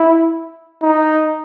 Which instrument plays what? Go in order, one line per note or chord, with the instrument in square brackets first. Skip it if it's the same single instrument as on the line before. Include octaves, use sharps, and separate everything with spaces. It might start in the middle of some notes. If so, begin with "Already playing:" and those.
Already playing: [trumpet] E4
D#4